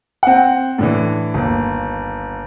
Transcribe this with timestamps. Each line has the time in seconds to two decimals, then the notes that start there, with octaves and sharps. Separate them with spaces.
0.23 C4 F#5
0.78 A2 D3 E3
1.34 G1 D#2